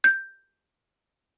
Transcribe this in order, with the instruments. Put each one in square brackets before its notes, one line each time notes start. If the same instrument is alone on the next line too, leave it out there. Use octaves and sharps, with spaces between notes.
[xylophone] G6